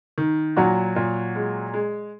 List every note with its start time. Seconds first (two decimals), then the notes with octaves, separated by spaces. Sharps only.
0.18 D#3
0.57 A#2 F#3 F#4
0.96 A#2
1.35 G#3
1.74 G#3